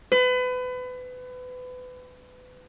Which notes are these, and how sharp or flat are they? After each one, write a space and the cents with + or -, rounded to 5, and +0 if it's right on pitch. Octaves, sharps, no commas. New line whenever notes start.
B4 +30